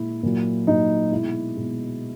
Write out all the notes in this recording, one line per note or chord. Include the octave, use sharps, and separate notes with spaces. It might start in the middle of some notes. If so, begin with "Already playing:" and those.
Already playing: A#2 G#3 E4
A#2 F#3
A#2 F#3 D#4
B2 G#3 E4
B2 G#3